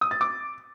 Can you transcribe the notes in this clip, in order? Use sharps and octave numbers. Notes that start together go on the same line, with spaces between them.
D#6
A6
D6